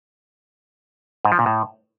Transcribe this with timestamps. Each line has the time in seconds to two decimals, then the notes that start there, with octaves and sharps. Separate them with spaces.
1.25 G#2
1.32 F3
1.39 A#2
1.46 A2